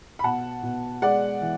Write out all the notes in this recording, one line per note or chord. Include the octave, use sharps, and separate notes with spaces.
B5
B2 F#5 A5
B2
G#3 D5 F#5
E3